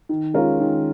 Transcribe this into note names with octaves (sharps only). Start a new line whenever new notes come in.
D#3
G#3 C#4 F4 A#4
D#3